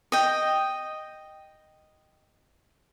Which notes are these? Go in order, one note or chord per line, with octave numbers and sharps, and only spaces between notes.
D#5 G5